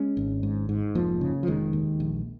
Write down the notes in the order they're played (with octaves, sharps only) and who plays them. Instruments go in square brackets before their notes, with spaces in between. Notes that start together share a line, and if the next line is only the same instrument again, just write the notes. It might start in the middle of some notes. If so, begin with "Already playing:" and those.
Already playing: [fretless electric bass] G#3 C#4
G#1
G#2
G#2
F1 F3 A#3
C#3
F3
F1 D#3 G#3
D#2
A#1